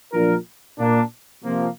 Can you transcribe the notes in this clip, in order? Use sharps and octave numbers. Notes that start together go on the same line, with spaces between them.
A#2 F3 D4 F4 A#4
A#2 A#3 D4
C3 F3 A#3